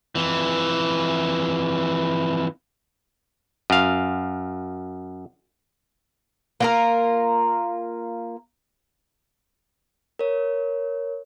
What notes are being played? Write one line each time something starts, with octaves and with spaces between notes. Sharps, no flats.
F2 E3
F#2 F5
A#3 F4 A#4
A#4 C#5